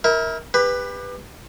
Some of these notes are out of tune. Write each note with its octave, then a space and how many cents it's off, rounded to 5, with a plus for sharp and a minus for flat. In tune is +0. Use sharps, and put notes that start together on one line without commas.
E4 -35 A#4 +0
G4 +30 B4 +0